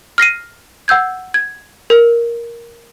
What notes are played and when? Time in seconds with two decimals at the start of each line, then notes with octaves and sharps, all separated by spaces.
0.18 F6 A#6 C7 D#7
0.88 F#5 E6 G6 G#6
1.34 G#6
1.90 A#4